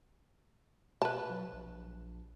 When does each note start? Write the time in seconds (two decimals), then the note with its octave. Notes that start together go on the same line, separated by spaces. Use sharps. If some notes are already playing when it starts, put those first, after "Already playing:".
1.02 B2 B4 A5
1.30 F#3
1.53 A#1